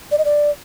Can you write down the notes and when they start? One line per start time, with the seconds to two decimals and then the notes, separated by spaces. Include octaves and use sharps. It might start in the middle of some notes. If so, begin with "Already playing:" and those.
0.12 D5
0.18 D#5
0.25 D5